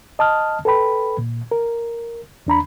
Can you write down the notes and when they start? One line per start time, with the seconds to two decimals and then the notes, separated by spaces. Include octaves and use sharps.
0.19 D#5 A5 D#6 F6
0.65 A4 B4 G5 B5
1.18 A#2
1.51 A#4
2.47 E2 D4 A#5 B5